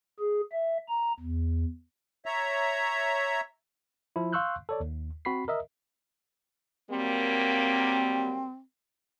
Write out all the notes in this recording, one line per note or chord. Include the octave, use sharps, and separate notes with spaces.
G#4
E5
A#5
E2
C#5 E5 A#5
F3 E4
F5 C6 C#6 E6 F#6 G6
A4 C#5 D5
D#2
C4 F#4 B5 B6 C7
A#4 D#5 E5
F#3 G3 A#3 C4